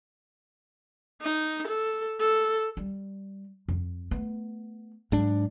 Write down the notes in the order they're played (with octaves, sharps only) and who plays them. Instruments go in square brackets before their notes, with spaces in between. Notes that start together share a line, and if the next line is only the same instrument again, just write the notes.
[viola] D#4
A4
A4
[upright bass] G3
F2
A3 B3
[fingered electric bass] G#2 D4 [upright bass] F#3